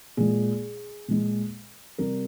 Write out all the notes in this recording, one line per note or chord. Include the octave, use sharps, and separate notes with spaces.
A#2 G#3 G#4
A#2 G#3
C3 G3 A#4